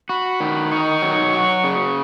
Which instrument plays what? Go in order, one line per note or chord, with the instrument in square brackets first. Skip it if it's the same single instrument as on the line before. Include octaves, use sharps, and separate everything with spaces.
[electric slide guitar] F#4 [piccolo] B5
[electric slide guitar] D#3
[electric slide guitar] D#4 [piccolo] C#6
[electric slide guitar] F#3
F#4
C#3